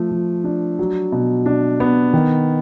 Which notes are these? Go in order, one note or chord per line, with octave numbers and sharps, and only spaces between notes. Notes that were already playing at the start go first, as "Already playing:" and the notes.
Already playing: F3 A3
F3
D4
F#3
B2
D4
B3
D#3